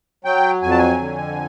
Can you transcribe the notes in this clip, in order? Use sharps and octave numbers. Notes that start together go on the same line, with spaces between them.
F#3 G5
F2 G#5
A5
G#5
D3